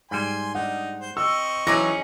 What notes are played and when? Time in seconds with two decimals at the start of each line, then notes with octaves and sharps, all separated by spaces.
0.11 G#2 G3 G#5 C6
0.55 D4 D#4 F#5
1.00 C5
1.17 C4 D#5 C#6 E6
1.67 E3 F#3 C#4 D#4 G#4 D6 A#6